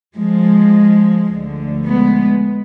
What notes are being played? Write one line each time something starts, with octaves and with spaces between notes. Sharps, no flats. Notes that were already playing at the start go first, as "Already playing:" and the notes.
F3 G#3
D2 D3 F3
G#3 B3